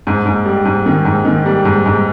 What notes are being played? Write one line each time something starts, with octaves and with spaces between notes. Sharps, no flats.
G#2
G#2
G3
G#2
D#3
G#2
D#3
G3
G#2
G#2